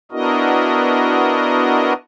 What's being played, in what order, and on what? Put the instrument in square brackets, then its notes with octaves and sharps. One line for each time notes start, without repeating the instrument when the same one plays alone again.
[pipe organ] B3 D4 E4 F#4 A#4 D#5